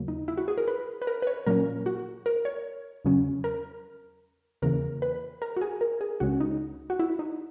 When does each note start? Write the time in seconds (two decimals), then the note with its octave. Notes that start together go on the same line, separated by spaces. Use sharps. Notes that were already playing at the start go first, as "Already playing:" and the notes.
Already playing: D#2 C#3 F#3 A#3
0.08 D#4
0.28 E4
0.38 F#4
0.48 G#4
0.58 A#4
0.68 B4
1.02 B4
1.07 A#4
1.22 B4
1.27 C#5
1.46 A#2 F#3 A#3 C#4 A#4
1.86 F#4
2.26 A#4
2.45 C#5
3.05 E2 C#3 F#3 C#4
3.44 A#4
4.62 E2 C#3 E3 A#3 A#4
5.02 B4
5.42 A#4
5.57 F#4
5.61 G#4
5.81 A#4
6.01 G#4
6.20 C#2 C#3 G#3 C#4 F#4
6.40 D#4
6.90 F#4
6.99 E4
7.19 D#4